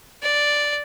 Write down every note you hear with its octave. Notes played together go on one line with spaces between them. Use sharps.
D5